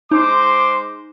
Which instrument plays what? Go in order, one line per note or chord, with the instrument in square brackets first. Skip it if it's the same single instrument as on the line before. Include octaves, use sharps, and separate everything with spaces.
[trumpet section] G#3 C5 D6 [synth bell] D#4